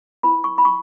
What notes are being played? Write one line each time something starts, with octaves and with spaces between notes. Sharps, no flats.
E4 B4 B5
C#6
B5
C#6